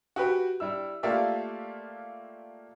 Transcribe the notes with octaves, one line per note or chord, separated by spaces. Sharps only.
F#4 G4 B4 G5
G3 E4 E6
A3 A#3 F4 G4 D5 E5